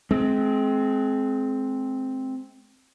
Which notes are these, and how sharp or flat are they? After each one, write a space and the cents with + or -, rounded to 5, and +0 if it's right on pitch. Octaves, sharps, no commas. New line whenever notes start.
G#3 +35 C4 +0